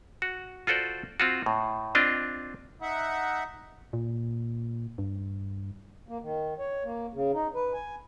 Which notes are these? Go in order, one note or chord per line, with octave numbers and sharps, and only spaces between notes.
F#4
F4 F#4 A4 C5 D5
C4 F4 F#4
A2
C4 D4 F4 D#5
D#4 E5 F#5
A#2
G2
A#3
D#3
C#5
A#3
C#3
D#4
B4
G#5